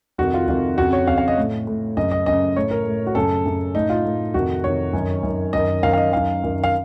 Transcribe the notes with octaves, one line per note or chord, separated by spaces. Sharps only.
F2 C3 D#3 F#4
F4
F2 C3 D#3 F4
F2 C#3 F#4
C#5
F2 C#3 F5
F5
D#5
A2
A2
F#2 C#3 D#5
D#5
F#2 C#3 D#5
A2 C#5
A#4
A2
F#4
F#2 C#3 A4
F#2 C#3
A2 D#4
F4
A2
F2 C3 D#3 F#4
F2 C3 D#3 C#5
F#2 D#3
F#2 D#3
F#2 D#3 D#5
F#2 D#3 F5
F5
D#5
F#2 D#3 F5
F#2 D#3
F5